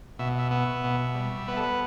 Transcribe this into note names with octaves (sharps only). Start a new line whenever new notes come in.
B2 E5
E5
B3 E5
B2
G3
B3 B4
A4
B4